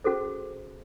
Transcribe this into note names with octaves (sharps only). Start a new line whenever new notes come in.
C#4 F#4 G#4 A4 C5